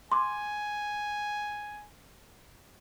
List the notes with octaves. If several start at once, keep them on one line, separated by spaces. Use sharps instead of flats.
G#5 C6 D6